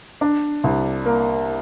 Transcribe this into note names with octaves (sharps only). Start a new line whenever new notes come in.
D4
C2
A#3